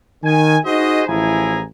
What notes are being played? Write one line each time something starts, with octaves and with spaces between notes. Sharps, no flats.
D#3 G#5
D#4 F#4 G#4 C5 D#5
A1 F3 E4 G#4 G#5 A#5